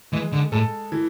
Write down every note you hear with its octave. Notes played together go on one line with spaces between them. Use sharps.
E3 G#3
D3
A2 A4
E3